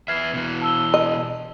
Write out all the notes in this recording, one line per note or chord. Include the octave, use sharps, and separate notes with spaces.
E2 B4 E5 F6 G#6 C7
B2 E3
A5 E6 G7
D#5